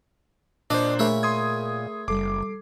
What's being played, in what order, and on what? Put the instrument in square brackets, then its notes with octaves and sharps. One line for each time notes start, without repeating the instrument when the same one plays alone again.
[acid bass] A#2 [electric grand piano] D4 C5 [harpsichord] D5 D#5
[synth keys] A3 G#4 A#4 [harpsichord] C#5 E5 B5
[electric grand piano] C6 D#6 G#6
[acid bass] F#1 [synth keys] G3 A4 C7 [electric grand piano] D6